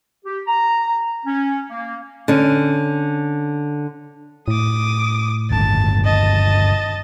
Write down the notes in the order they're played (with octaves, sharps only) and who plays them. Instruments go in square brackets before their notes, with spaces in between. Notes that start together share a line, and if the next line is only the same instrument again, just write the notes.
[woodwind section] G4
A#5
C#4
A#3
[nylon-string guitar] D3 C#4
[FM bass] A2 [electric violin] D6 D#6
[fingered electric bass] G1 D#2 [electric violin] A5
[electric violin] D#5 A5